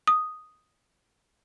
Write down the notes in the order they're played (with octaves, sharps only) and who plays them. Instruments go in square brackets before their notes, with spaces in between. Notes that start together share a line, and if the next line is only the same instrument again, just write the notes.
[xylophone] D#6